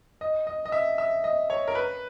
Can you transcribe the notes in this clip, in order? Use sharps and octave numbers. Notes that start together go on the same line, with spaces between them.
D#5
D#5
D#5
E5
E5
D#5
C#5
A#4
B4